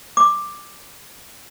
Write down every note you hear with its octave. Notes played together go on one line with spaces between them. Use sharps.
D6